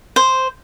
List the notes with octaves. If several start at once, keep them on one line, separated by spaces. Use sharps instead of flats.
C5